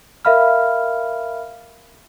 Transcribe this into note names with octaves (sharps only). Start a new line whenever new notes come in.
A#4 E5 F5 B5 F6